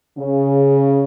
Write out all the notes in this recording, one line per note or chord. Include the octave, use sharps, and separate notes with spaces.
C#3